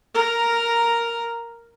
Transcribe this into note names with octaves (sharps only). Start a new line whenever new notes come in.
A#4 A#5